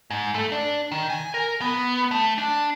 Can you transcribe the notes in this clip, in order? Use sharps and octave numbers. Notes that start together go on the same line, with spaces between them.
G#2
A3
D4
D#3
G#5
A#4
B3
A3
D4